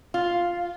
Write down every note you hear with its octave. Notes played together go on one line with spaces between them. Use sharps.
F4